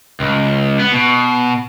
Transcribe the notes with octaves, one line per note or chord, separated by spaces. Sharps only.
C#2
B3
B2